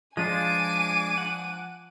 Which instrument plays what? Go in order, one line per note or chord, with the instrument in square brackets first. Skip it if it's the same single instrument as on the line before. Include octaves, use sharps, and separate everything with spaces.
[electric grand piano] F3 [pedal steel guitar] G#3 D4 F4 [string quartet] G#5 D6 [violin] D#7
[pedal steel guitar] F#5